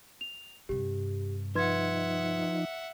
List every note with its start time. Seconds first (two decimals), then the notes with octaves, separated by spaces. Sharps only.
0.21 F7
0.69 G2 C3 G4
1.55 F3 D#4 B4 E5 F#5 C6 G#6